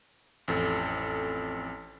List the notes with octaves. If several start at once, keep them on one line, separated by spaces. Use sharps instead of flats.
A1 F2 A4